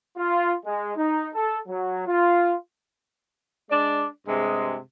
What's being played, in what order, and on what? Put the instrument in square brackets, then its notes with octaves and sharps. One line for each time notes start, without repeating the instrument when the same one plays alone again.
[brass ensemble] F4
G#3
D#4
A4
F#3
F4
[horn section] G#3 D4 D5
G2 C3 G#3